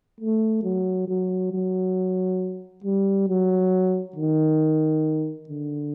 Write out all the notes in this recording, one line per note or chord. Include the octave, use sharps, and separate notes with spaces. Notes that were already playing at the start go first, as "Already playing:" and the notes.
A3
F#3
F#3
F#3
G3
F#3
D#3
D3